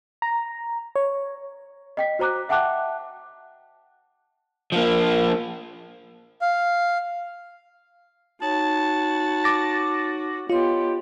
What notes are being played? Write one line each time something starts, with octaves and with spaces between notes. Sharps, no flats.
A#5
C#5
D#5 G5 B6
F#4 C5 A#5 D6 F#6
E5 F#5 G5 A5 D6 F#6
F3 A#3
F5
D#4 F#4 C#5 A5
D6 A6 A#6
B3 F4 G4 C#5 D#5 C6